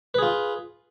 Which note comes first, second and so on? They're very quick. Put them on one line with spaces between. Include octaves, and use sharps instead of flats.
B4 G#4 F4